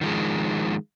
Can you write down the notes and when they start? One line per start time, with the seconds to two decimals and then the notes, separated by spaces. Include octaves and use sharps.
0.01 D#3 F3 G#3